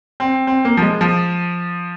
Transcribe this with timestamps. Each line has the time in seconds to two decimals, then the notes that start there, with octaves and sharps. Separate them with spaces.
0.20 C4
0.47 C4
0.65 A#3
0.77 F3
0.82 G#3
1.01 F3